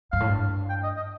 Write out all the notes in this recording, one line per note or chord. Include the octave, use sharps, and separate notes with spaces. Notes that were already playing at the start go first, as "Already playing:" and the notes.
G2 F5
A2
G2
G5
D#5
D#5